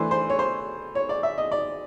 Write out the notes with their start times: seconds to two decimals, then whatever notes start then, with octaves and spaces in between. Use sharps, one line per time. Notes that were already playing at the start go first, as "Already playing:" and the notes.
Already playing: E3 A3 D4 C5
0.11 C5
0.30 C#5
0.39 C5
0.95 C#5
1.09 D5
1.23 E5
1.38 D#5
1.52 D5